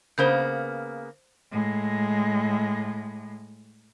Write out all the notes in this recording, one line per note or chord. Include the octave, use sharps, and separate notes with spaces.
C#3 A#3 B3 C5 G6
A2 G#3